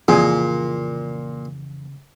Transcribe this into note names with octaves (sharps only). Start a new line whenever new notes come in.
C2 F2 A#2 C#3 E3 G#4